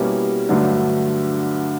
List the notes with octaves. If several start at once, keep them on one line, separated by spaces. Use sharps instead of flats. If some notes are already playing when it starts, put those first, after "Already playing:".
Already playing: B2 G3 A#3 C#4 E4
G2 D3 F#3 A3